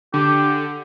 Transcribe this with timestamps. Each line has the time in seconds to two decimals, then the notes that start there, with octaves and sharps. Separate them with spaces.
0.14 D3 G4